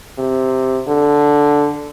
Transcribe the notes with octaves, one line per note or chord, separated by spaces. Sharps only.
C3
D3